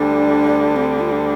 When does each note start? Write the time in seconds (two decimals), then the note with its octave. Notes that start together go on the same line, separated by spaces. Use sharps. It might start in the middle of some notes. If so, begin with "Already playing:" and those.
Already playing: D2 D3 G3 D4
0.76 C4
1.00 F4
1.12 D4